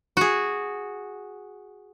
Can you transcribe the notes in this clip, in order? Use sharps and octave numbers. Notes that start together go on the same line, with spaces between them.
F#4 G#4